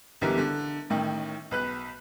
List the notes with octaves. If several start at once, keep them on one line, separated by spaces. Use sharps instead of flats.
B1 D3 E3 G3 A#4
D3
A1 A2 D#3
B1 B4 F#6